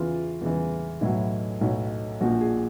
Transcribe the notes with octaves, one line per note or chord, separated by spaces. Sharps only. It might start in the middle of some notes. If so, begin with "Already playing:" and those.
Already playing: E2 C#3 E3 F4
E2 C#3 E3
B1 A2 F#3 E4
B1 A2 F#3
A#1 A#2 F3 F#4
G#4